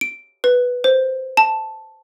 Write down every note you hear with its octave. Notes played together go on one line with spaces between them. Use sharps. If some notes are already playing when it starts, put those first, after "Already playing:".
D7
B4
C5
A5